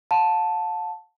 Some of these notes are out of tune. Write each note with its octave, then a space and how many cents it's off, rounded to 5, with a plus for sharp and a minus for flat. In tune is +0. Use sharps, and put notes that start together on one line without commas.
F5 +45 A5 +0